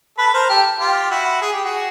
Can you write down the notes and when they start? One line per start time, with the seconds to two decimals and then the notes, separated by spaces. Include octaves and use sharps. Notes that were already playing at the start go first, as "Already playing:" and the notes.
0.18 A4 B4
0.34 A#4 C5
0.49 G4 A4
0.80 F4 G4
1.11 E4 F#4
1.42 G#4
1.53 G4
1.64 F#4 G#4